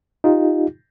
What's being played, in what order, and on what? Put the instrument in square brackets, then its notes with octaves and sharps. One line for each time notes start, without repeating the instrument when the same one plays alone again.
[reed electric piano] D#4 F4 G4